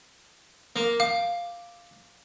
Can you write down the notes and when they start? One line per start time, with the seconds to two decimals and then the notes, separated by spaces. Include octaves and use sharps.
0.76 A#3
1.00 F5 D6